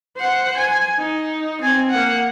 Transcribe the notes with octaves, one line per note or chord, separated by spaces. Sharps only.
C5 F#5
G#5
D#4
C4 G#5
A#3 F#5